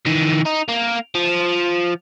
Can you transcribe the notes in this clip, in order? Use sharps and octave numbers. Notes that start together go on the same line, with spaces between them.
D#3 E3
D#4
A#3
F3